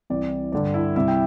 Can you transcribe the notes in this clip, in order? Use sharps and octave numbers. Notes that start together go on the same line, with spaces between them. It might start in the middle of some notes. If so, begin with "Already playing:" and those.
C2 C3 E3 G3 D5
G2 D3 G3 D5
E4 E5
C2 C3 G3 E4 E5
G5